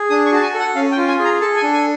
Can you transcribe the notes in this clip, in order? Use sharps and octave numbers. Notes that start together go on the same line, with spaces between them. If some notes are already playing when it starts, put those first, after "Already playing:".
Already playing: G#4
D4 D#6
C#6
F#4 A5
G#5
A4
F#5
C#4 F5
G5
F4
G#5
G#4
A#5
A4 A5
G#5
D4
G#5